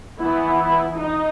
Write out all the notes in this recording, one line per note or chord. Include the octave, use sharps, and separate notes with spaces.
E3 B3 E4
E4
D#4